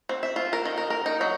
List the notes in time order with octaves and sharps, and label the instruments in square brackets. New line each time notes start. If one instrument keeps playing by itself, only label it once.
[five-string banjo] C4
E5
F4
A#4
D#3
A#4
A#4
D#4
F#3